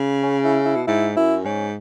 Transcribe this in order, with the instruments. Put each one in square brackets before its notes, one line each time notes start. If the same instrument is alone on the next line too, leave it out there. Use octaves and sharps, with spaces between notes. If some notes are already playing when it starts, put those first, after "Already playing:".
Already playing: [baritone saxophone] C#3
[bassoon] C#4
E4
E4
[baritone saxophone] B2
[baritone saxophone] G#2 [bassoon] E4
[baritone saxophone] F#2 [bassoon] E4
[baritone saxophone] G#2 [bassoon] C#4